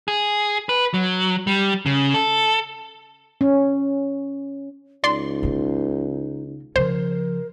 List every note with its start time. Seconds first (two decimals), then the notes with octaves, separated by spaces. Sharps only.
0.08 G#4
0.69 B4
0.94 F#3
1.47 G3
1.86 C#3
2.14 A4
3.41 C#4
5.04 C#2 D#4 D5 C6
5.43 C#3 A#3
6.76 C#3 F3 A#4 C5